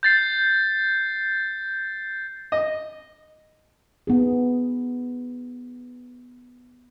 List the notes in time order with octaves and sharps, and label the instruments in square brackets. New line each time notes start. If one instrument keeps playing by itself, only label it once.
[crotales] G6 A6 C7
[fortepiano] D#5
[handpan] B3 D#4 G#4